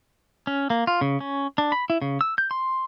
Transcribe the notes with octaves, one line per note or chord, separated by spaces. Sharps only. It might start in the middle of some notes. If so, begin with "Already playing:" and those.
C#4
A#3
F4
C#3
C#4
D4
B5
E4
C#3
E6
G6
C6